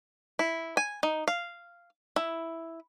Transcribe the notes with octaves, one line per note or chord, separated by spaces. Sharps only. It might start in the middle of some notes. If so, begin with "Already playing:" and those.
E4
G#5
D#4
F5
E4